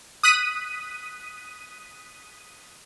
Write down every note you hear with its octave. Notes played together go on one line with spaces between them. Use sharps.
D#6 F#6 B6 D#7